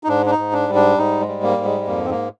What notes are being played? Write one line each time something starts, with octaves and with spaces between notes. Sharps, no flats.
D#4
G#2 D4
D4
D#4
G#2
D4
G3
D4
G#2 D#4
G#3
G3
A#3
G#2
G#3
G#3
F2 A#3
C4
A#3